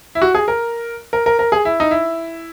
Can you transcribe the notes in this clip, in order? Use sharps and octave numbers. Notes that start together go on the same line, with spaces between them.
E4
F#4
G#4
A#4
A#4
A#4
A#4
G#4
E4
D#4
E4